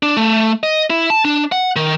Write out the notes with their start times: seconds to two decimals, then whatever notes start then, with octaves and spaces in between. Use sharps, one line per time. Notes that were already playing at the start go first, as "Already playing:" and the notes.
0.03 D4
0.17 A3
0.63 D#5
0.90 E4
1.10 A5
1.25 D4
1.52 F#5
1.76 D#3